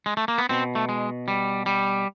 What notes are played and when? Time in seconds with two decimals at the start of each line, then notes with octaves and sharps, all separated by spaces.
0.06 G#3
0.17 A3
0.28 A#3
0.38 B3
0.49 B2 C4
0.75 A3
0.89 G#3
1.28 G3
1.66 G3